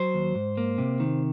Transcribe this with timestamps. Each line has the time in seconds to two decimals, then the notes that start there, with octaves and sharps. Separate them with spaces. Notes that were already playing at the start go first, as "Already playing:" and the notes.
Already playing: F#3 C5
0.14 D#2
0.35 G#2
0.57 A#3
0.78 C3
1.00 D#3